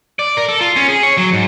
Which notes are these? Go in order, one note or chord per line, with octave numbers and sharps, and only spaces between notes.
D5
A#4
A4
F4
C#4
G#4
C#5
F#3
G#2